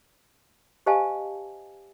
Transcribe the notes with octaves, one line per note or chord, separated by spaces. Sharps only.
G4 C5 D#5 F5 G#5 A5